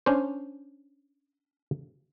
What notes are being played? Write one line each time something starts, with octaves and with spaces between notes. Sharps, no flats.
C#4 D4 C5